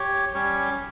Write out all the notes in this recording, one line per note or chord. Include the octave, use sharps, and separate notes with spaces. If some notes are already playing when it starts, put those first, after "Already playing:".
Already playing: G4 C#5
G3 C#4 G4 C#5